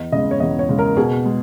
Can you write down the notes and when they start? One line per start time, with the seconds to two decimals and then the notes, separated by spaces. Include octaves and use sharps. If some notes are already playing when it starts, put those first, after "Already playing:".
Already playing: E2 D#5
0.12 C#3 G#3 D#5
0.31 C#5
0.40 E2 D#5
0.59 C#5
0.69 C#3 G#3
0.79 A#4
0.97 B2 G#4
1.26 G#3